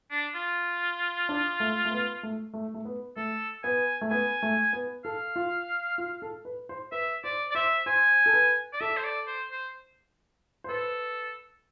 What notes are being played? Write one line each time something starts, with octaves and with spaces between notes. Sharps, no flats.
D4
F4
D4
A3
A3
B3
A3
A3
A3
B3
A3 A4
B3 G#5
A3
B3 G#5
A3
B3
A4 F5
F4
F4
A4
B4
C5
B4 E5
C5 D5
D5
C5 E5
C5 G#5
A4
B4
D5
A4 E5
C5
D5
C5
C5
C5
A4 B4